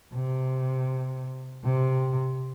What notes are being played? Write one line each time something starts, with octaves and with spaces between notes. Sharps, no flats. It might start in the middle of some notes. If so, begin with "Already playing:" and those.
C3
C3